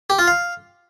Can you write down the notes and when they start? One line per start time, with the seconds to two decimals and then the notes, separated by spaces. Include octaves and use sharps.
0.10 G4
0.19 F4
0.27 F5